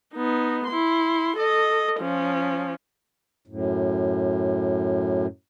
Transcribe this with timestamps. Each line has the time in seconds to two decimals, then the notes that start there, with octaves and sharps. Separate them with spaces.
0.14 B3 D#4
0.67 E4 C6
1.37 A4 D#5
2.00 F3 C#4
3.47 F#2 A2